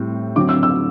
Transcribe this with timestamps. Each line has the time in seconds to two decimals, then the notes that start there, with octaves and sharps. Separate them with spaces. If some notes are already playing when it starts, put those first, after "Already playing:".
Already playing: A2 G3 C4
0.36 D3 F#3 C4 D6
0.49 E6
0.63 E6